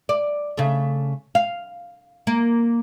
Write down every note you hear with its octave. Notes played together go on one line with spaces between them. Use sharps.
D5
C#3 A3
F5
A#3